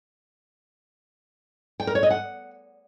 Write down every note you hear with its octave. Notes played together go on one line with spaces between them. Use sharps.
G5
A#4
C#5
D#5
F#5